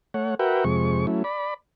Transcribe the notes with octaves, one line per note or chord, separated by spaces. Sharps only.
A3 C#5 F#5
F#4 A#4 B4 E5 F#5 G5
F2 C3 G#3 C#6
F#3 A3 C#4 E4
D5 B5